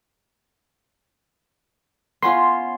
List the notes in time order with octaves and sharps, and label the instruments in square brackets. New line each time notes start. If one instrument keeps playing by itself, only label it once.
[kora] B3 C#4 F4 [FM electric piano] C6